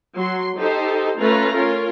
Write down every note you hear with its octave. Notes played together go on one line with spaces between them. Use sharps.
F#3 C6
D#4 G4 A4 C5
A3 C#4 F4 B4 A#5
C#4 F4 A#4